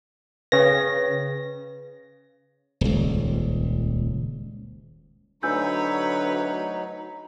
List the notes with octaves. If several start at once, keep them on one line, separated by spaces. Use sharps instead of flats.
C#3 B4 C#5 A#6
D#1 C#2
D2 F#3 D#4 B4 C#5 G#5 E6 G6